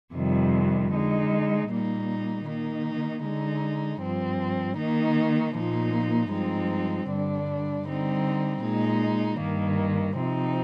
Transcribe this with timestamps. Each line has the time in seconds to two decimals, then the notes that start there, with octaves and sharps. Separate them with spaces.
0.14 F2 C3 D#3 G3
0.92 D3 G#3 D#4
1.68 A#2 G3 A#3 D#4
2.46 D#3 A#3 D#4
3.23 D3 G#3 D#4
4.00 G2 F3 C4
4.76 D#3 A#3 D#4
5.54 A#2 F3 A#3 D#4
6.31 G2 F3 G#3 C4 D#4
7.08 G2 D3 G3 D4
7.85 D3 G3 C4 D#4
8.62 A#2 G#3 D#4
9.39 G2 D#3 A#3
10.16 C3 F3 C4 D#4